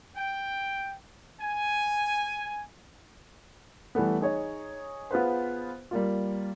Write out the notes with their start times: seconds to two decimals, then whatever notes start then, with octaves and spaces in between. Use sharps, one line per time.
0.16 G5
1.41 G#5
3.95 E3 G3 A3 B3
4.21 D#4 G#4 C#5 D#5
5.11 B3 F4 G#4 B4 C5
5.91 G3 A#3 F4